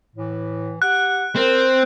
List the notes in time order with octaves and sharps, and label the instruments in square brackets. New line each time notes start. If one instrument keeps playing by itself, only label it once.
[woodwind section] A2 E3
[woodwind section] G4 F#5 [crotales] F#6
[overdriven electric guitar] C4 [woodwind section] A#4